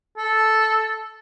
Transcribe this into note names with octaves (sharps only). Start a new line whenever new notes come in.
A4